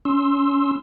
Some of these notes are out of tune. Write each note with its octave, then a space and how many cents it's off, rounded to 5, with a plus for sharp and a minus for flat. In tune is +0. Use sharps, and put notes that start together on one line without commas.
C#4 +25 C6 +20 E6 +0